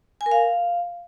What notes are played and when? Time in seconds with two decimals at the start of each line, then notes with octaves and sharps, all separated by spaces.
0.21 G#5
0.26 A#4
0.31 F5